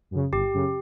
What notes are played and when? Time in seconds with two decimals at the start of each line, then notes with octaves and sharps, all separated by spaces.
0.11 F#2 C#3
0.32 G1 G4
0.54 F#2 C#3